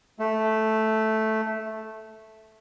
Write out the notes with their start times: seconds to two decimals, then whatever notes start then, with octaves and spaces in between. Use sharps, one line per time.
0.19 A3